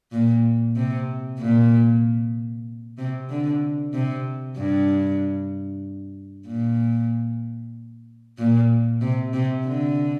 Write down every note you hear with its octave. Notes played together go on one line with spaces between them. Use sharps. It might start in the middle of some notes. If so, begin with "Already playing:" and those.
A#2
C3
A#2
C3
D3
C3
G2
A#2
A#2
C3
C3
D3